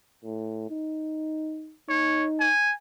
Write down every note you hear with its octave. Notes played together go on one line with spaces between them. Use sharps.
A2
D#4
D#4 C#5
G#5